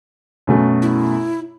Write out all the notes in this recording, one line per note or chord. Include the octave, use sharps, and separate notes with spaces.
F#2 B2 A3
E4